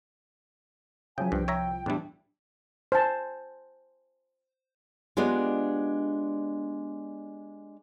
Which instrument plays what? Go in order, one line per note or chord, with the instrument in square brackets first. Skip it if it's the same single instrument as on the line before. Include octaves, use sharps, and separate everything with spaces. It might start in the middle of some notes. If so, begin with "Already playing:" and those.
[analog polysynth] C#3 F3 F#3 [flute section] E5 G#5 [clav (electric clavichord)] G5
[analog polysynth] C2 F3 [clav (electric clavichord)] G2 [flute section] G5
[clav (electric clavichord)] C#5 E5 A#5
[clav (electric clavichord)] E2 G3 [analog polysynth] A2 D4 E4
[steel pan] C5 G#5 A5
[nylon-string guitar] G#3 B3 D4 F4 G4 D#5